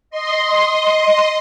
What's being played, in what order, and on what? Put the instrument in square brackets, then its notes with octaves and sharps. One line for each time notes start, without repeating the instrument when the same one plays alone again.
[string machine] D#5 C6